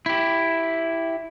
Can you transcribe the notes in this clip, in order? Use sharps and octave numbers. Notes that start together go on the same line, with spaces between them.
E4 G4